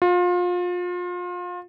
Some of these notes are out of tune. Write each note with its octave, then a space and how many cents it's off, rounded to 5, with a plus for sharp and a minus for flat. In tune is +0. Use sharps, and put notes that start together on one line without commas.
F4 +30